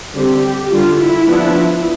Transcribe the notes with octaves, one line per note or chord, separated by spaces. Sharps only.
D3 G3 C4 G4
D3 G3 D4 F4
E4
F3 B3 D4